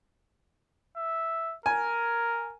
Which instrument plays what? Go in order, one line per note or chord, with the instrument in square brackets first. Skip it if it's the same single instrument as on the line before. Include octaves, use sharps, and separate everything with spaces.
[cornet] E5
[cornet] A#4 [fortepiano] G#5